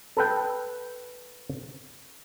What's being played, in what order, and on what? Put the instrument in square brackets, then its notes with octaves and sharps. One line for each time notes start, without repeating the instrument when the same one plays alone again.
[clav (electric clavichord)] A4 B4 G5